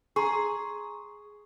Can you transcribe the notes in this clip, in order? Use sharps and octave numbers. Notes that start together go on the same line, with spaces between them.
G#4 A#5 C6 C#6